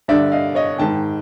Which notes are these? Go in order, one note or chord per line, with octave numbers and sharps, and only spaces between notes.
G2 D3 D5 E5
D#5 F5
C#5 D#5
G#2 D#3 G5 A5